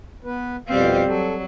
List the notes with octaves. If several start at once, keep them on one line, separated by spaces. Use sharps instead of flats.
B3 B4
F2 B2 G3 C4 F5
F#3 A4